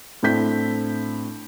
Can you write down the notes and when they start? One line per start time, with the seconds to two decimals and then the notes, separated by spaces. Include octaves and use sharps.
0.23 A2 C4 D4 E4 G6 B6